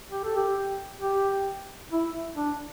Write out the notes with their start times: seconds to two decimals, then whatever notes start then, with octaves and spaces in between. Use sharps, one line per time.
0.12 G4
0.24 A4
0.36 G4
1.01 G4
1.92 E4
2.36 D4